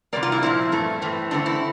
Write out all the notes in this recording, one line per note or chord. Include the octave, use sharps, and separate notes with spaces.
C3 G3 A#3 D5
F4
E4
A#2 F3 C4 E4
G2 E3 A3
A2 E3 A3 C4
G2 D3 A3 C4 D4
E4